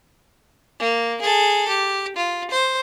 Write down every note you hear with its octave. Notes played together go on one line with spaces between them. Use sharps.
A#3
G#4 A4
G4
F4
C5